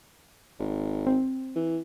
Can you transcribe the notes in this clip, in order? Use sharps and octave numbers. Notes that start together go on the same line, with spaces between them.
G#1
C4
E3